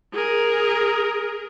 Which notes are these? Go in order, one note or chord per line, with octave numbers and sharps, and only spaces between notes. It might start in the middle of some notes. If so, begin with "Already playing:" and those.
G#4 A#4